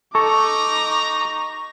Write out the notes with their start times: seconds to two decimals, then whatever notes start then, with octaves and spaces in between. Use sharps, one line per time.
0.15 D#4 A4 A#5 C#6 D6